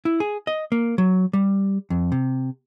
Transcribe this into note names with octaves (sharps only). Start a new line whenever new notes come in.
E4
G#4
D#5
A#3
F#3
G3
F2
C3